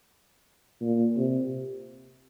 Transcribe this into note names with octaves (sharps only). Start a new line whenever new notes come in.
A#2
C3